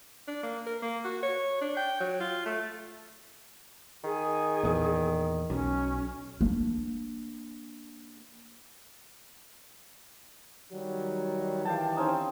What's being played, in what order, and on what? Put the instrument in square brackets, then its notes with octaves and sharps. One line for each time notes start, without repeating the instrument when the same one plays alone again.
[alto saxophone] D4
A#3
A#4
A#3
F#4
C#5
D4
G5
F#3
F4
A3
[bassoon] D#3 [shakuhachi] G#4
[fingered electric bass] E2 A#2
[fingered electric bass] B1 [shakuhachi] C#4
[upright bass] A#3 D4
[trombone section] D#3 F#3 G3
[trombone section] D#3 E3 G4 [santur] F5 G5 A5
[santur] C4 C#4 D#4